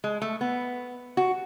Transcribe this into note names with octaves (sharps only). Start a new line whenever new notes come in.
G#3
A3
B3
F#4